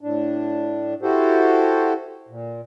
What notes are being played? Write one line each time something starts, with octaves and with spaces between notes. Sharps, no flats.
A2 D4
E4 F#4 G4 A4 C5
A#2